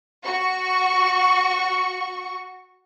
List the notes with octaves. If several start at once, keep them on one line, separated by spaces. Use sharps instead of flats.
F#4 C#6